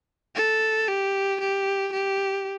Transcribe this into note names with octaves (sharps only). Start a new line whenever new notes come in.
A4
G4
G4
G4